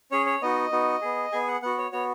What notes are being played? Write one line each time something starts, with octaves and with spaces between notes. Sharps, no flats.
C#4 G#4 C#5
C#5
B3 D#4 F#4 D#5
B3 D#4 F#4
B3 G#4
B3 G#4 G#5
F#5
B3 F#4 F#5
C#5
B3 F#4 C#5